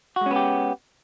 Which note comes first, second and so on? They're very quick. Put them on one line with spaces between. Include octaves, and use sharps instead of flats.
F#4 G#3 C#4 B3 G4